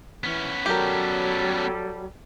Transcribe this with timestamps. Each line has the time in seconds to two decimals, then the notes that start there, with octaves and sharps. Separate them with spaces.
0.24 E3 B3 C#4
0.66 F#3 G3 G4 A4 A#4